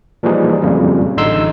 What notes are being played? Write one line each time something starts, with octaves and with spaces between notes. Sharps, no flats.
A#2 E3 F3 G3 D#4 G#4
F2 A#2 C#3 F#3 G3
A1 D3 D#4 C6 E6